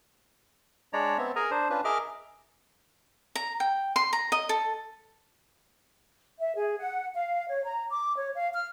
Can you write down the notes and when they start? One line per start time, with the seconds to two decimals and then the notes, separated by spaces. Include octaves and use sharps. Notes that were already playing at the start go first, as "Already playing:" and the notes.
0.93 G#3 D4 C#5 D5 A#5
1.18 B3 C4 E5
1.36 G#4 A#4 G#5 A#5
1.51 D4 C5
1.70 C#4 D4 F4 B4
1.85 G#4 A#4 D#5 E5 D6 F6
3.35 A#5
3.60 G5
3.96 C6
4.13 A#5
4.32 D#5
4.49 A4
6.38 E5
6.55 G#4
6.78 F#5
7.14 F5
7.48 C#5
7.64 A#5
7.90 D6
8.16 C#5
8.34 F5
8.53 F6